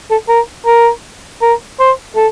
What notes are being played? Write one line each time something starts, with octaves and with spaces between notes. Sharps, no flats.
A4
A#4
A#4
A#4
C5
A4